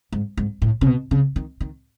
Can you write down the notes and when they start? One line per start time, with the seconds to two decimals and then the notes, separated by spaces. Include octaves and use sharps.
0.12 G#2
0.37 G#2
0.62 A2
0.81 C#3
0.86 B2
1.11 C#3
1.36 D#3
1.60 D#3